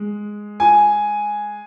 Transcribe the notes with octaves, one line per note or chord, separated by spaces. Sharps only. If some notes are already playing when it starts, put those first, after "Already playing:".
Already playing: G#3
G#5